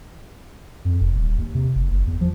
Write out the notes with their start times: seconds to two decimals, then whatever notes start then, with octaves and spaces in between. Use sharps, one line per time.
0.85 F2
1.01 F1
1.16 D#1
1.38 D#2
1.55 C3
1.75 F#1
1.91 F#1
2.06 E2
2.21 F3